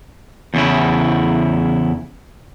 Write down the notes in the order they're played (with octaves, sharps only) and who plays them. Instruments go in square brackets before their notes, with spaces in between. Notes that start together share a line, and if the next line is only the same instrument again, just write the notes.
[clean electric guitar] E2 C#3 E4